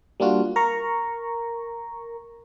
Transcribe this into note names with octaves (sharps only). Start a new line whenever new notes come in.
G3 A#3 D4 F4 F#4
A#4 A#5 C#6